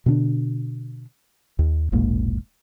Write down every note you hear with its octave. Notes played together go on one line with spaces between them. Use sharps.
B2 D3 C#4 D4
D#2
E1 A#1 G#2 A#3